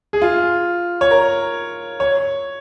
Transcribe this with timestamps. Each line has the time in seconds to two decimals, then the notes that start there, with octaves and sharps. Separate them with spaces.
0.13 G#4
0.22 F4
1.01 C#5
1.11 A#4
2.00 C#5